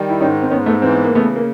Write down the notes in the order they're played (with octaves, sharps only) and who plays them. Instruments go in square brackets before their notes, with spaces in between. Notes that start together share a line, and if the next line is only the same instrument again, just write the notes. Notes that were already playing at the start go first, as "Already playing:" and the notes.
Already playing: [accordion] D#3 G3
[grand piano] E4
[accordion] G#2 [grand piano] C#4 D#4
[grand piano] C4
[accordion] G#2 [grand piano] B3 C#4
[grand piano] A3 B3
[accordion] E3 [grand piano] C4
[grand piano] B3
A#3
[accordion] C#3 [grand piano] A3 B3
[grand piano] A#3